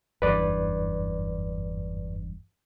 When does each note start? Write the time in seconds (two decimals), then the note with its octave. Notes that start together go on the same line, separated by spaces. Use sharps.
0.22 F#1 E2 G2 B4 D5